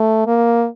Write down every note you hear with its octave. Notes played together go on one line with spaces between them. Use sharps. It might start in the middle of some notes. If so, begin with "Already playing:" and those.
Already playing: A3
A#3